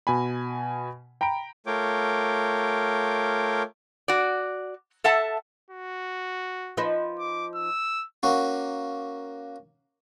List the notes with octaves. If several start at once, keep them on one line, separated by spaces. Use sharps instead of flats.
B2 G#5 B5
G5 A#5 B5 D7
A3 F4 A#4 C#5 G5 D6
F#4 D5
A4 E5 F#5 A5
F#4
F3 D#4 B4
D6
E6
A#3 C#4 F#4